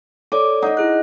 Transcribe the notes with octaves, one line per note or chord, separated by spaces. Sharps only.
A4 C#5 D5 D6
D#4 D#5 F#5
E4 G#4 F#6